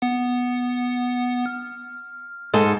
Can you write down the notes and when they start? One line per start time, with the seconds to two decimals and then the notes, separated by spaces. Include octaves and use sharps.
0.02 B3 F#5
1.46 F6
2.53 G#2 G#3 A4